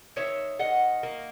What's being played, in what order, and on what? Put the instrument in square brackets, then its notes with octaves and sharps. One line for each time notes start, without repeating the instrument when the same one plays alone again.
[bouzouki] D#3 C#5 E5
D#3 D#5 F#5
A#3